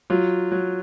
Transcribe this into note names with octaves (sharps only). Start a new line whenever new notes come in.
F#3 F4
F#3